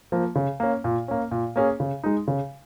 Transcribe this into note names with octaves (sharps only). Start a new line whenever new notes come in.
F3 A#3
C#3
A#3 C#4
A#2
A#3 C#4
A#2
A#3 C#4 G#4
C#3
G#3 D#4
C#3